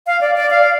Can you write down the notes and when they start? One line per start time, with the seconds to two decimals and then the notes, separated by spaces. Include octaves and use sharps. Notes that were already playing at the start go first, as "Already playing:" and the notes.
0.07 F5
0.21 D5
0.36 D5
0.50 F5